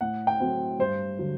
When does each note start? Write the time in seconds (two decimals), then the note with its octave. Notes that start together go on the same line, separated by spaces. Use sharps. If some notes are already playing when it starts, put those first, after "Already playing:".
0.01 A2 F#5
0.27 G5
0.40 F#3 A3 C4
0.79 G2 C5
1.19 D3 F#3